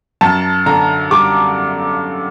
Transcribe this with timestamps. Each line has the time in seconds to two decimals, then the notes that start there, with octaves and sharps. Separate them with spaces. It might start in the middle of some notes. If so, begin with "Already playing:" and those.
0.21 F#2 A5
0.66 D3 A#5
1.11 G3 D6